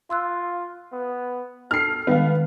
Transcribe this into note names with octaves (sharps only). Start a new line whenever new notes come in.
F4 C6 E6 F#6
B3
A4 F6 C7
D#3 G3 G#3 B3 F5